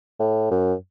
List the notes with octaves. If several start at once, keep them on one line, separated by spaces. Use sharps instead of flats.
A2
F#2